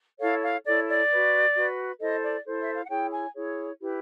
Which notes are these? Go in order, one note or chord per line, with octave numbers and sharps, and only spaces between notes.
E4 A4 C#5 F5
F5
E4 A4 C#5 D5
D5
F#4 B4
F#4 B4
E4 A4 C5 D#5
D5
E4 A4 C5
E5
F5
F#5
E4 G#4 C#5 G5
G#5
E4 G#4 C#5
E4 G4 B4